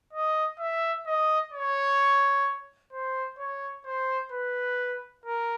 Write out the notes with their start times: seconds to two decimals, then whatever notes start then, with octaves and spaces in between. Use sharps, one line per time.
0.13 D#5
0.59 E5
1.06 D#5
1.53 C#5
2.93 C5
3.38 C#5
3.86 C5
4.32 B4
5.25 A#4